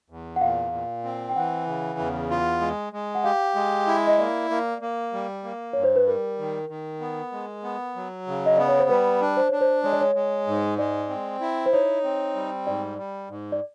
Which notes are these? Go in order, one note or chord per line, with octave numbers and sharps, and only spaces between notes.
E2
F#5
A#2 F5
A#2
C4
G5
E3 F#5
C#3
E2
F4
G#3
G#3
F#5
G4 F5
G#3
E4
D#5
A#3 D5
A#3
A#3
G3
A#3
G2 C#5
C5
B4
G3 A#4
D#3
D#3
B3
G#3
B3
F#3
C#3
D#5
B3 D5
C#5
C5
G3 B4
D4
C5
D4 C#5
C5
G#3 C#5
D5
C#5
G#3
G#2
G#3 D5
C4
E4
C5
D#4 C#5
C4
G3
G#2 D5
G3
G#2
D5